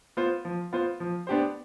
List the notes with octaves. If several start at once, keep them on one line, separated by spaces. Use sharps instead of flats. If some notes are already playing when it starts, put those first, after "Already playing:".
B3 F4 C5
F3
B3 F4 C5
F3
B3 D4 G4 C5